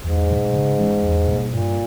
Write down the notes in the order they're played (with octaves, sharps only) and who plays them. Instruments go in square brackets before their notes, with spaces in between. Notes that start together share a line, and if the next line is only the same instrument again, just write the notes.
[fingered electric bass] E2 [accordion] G#2
[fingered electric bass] B2 F#3 A3
C#3
E3 G#3 C#4
E2
B2 G3 A#3
[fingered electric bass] G2 [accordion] A#2